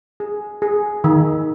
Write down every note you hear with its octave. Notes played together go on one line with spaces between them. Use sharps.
G#4
G#4
D#3